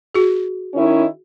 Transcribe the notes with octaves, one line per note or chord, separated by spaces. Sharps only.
F#4 G#4
D#3 C#4 E4